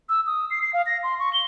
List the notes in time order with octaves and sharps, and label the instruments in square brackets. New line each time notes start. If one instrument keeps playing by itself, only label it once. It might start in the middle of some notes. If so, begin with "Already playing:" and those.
[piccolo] E6
D#6
C7
C7
F5
A#6
C6
C#6
G7